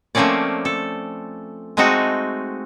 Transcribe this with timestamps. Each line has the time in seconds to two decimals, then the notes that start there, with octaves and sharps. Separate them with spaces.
0.15 F3 A3 A#3 C4 C#4 D5
0.65 A4
1.77 G#3 A3 C4 D#4 F#4 A4